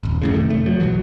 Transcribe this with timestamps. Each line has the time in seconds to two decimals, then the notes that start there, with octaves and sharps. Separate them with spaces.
0.03 D#1 G#1
0.22 F2 A2 C#3
0.33 C3 D#3 A3
0.49 F1 A3
0.66 F3 F#3
0.80 B1 B2 E3 F#3